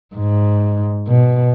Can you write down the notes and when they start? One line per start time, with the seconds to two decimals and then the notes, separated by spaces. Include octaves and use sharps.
0.15 G#2
1.08 B2